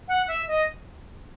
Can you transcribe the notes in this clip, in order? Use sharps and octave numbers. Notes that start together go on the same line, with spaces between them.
F#5
E5
D#5